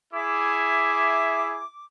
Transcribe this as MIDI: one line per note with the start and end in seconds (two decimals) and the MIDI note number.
0.13 1.61 64
0.13 1.61 68
0.13 1.61 76
0.13 1.84 86